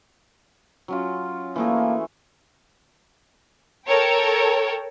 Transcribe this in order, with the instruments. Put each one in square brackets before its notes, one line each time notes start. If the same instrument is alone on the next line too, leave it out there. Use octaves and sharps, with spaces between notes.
[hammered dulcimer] F#3 C#4 F4
[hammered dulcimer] E3 A3 G#4 [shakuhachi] A#3
[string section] A4 A#4 C#5 G5